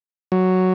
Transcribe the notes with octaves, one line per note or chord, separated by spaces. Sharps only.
F#3